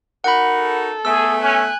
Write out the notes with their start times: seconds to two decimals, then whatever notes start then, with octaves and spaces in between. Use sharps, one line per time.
0.24 D#4 F#4 A#4 F#5 B5
0.59 A4
1.05 A3 B3 G#4 E6
1.43 C#4 G#5 F#6